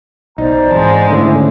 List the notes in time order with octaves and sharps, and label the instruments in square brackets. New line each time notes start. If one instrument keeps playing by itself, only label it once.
[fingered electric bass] B1 [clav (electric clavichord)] D#4 [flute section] C5 D5 A#5
[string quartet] G#2 G#3 [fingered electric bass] E3 C4 [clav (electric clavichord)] A5
[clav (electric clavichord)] D3 C#4 E4 [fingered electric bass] D#3 A3 [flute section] E5